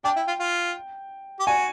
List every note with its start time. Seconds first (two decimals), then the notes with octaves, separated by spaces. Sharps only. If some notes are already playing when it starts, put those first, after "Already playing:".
0.04 D4 G5
0.16 E4
0.27 F4
0.40 F4
1.40 G4
1.46 F#4 G#5